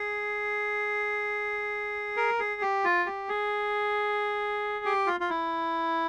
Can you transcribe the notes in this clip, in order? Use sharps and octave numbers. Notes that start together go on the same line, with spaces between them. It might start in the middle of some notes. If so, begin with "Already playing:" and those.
Already playing: G#4
A#4
G#4
G4
F4
G4
G#4
G4
F4
F4
E4